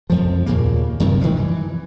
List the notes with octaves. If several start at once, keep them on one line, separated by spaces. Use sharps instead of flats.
F2 F3
D#2 A#2 C#3 A#3
F#2 C3 D#3
D#3 F3 G3 G#3
E3